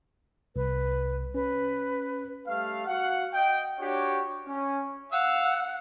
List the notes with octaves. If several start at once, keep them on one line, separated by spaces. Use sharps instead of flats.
C2 B4
C#4 B4
G3 A3 F5
F#4 F5 F#5
D#5 G5
D4 F#4 G4 C#5
C#4
F5 F#5 E6